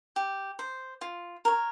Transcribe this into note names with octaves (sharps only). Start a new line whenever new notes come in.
G4
C5
F4
A#4 C#5